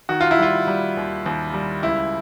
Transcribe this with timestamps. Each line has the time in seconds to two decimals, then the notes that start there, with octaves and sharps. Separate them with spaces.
0.09 D#3 F#4
0.21 F4
0.31 E4
0.39 G3 F4
0.67 G3
0.97 D#2
1.26 D#2
1.54 G3
1.83 C#2 E4